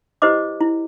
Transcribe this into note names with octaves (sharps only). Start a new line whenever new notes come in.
E4 G4 B4 C5 D#5 D6
E4